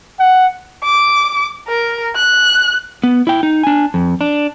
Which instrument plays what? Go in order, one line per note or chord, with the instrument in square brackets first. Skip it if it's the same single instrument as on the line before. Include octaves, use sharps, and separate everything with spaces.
[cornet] F#5
[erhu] D6
A#4
F#6
[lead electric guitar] B3
E4 G5
D#4
D4 G#5
F2
D4